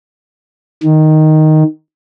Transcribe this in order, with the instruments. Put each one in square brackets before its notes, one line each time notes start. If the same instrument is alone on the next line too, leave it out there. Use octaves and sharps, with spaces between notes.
[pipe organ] D#3